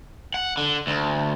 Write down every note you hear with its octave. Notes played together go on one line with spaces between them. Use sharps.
F#5
D3
D2